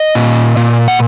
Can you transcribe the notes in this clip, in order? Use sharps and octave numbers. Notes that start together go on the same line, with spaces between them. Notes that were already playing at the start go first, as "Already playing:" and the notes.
Already playing: D#5
A#2
A#2
F#5